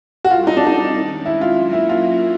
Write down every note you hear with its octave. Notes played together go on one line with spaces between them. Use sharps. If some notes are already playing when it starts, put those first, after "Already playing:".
F#4
G3 C4 E4 F4 A4
D#4
D4
D#4
D#3 G#3 C#4
E4
F4
F#3 A#3 C#4 F#4 A#4
E4
F4